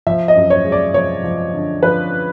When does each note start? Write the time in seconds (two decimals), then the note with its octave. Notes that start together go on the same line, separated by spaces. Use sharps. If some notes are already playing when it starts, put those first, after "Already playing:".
0.07 F3 E5
0.28 D#5
0.36 F#2
0.50 C#5
0.65 G#3
0.72 D5
0.94 F3 C#5
1.24 F3
1.54 D3
1.83 F3 B4